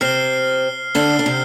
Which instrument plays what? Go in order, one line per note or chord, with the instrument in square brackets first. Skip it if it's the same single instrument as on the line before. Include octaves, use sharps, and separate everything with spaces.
[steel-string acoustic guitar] C3 C4 [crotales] F6 C7 G7
[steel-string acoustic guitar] D3 D4 [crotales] F6 C7 G7
[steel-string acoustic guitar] D4
C3 C4